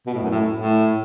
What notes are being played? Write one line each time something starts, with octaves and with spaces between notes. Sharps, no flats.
B2
A2
F#2
A2
A2